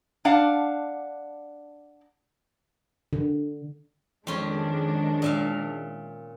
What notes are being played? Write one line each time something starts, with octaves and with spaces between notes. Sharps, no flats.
D4 D5 F5 F#5 A5
D3
F2 D#3 G#3 C#4 D4 C6
A#2 E5 F5